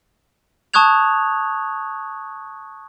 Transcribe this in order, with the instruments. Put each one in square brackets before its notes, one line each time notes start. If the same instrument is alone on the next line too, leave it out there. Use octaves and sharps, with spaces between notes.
[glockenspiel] A5 C#6 D#6 F#6 G#6 F7